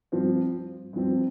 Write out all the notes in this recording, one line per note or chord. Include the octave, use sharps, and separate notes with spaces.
G2 F3 C4
G2 F3 C4